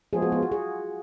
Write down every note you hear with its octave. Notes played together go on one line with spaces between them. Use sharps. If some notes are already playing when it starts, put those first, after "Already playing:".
F3 G#3 B3 G#4
F#4
F4
F#4
G#4